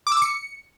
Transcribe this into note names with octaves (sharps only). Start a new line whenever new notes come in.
D6
E6
D6
C#7